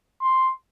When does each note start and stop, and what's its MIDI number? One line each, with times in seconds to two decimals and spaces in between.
0.22 0.52 84